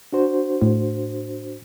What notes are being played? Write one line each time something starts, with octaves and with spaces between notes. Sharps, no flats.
D4 F#4 C5
A2